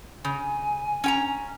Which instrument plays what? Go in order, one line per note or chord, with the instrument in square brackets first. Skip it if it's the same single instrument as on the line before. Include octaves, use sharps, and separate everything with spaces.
[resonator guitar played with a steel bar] C#3 [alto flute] G#5
[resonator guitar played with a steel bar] C#4 G5 A#5